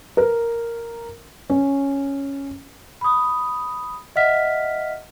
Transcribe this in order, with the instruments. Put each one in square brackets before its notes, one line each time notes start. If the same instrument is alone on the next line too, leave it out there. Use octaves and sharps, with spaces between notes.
[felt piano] A#4
C#4
[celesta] B5 D#6
D#5 E5 F#5 F6 B6